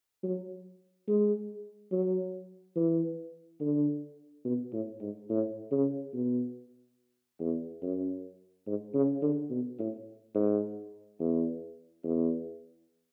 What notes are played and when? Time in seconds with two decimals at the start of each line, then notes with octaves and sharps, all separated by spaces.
0.23 F#3
1.08 G#3
1.92 F#3
2.76 E3
3.61 D3
4.45 B2
4.73 A2
5.01 G#2
5.29 A2
5.71 C#3
6.13 B2
7.40 E2
7.82 F#2
8.66 G#2
8.94 C#3
9.22 D3
9.50 B2
9.79 A2
10.35 G#2
11.19 E2
12.04 E2